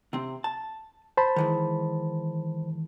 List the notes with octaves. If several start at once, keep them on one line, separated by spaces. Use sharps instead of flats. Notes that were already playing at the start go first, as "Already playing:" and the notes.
C3 C4
A5
C5 A5 B5
D#3 E3 G#3